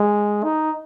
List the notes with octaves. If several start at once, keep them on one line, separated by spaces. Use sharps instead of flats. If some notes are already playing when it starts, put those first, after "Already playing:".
Already playing: G#3
D#4